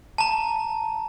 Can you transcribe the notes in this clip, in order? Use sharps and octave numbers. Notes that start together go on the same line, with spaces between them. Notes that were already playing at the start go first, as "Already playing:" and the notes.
A5 A#5